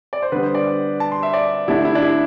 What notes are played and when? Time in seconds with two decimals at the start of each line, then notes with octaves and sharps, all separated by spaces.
0.13 D5
0.22 C5
0.32 D3 G3 B3 B4
0.43 C5
0.55 D5
1.00 A5
1.12 C6
1.23 E5
1.33 D5
1.68 D3 A3 D4 E4
1.85 E4
1.95 D4
2.02 E4